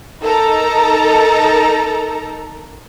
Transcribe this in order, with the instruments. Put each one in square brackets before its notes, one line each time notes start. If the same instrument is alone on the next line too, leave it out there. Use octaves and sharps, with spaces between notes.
[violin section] D#4 A4 A#4 A#5